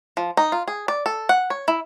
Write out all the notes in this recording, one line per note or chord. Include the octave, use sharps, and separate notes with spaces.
F3
D#4
F4
G#4
D5
A4
F#5
C#5
E4